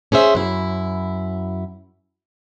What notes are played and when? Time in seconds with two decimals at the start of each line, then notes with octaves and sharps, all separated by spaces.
0.12 C#4 G#4 C5 E5
0.35 F#2 E4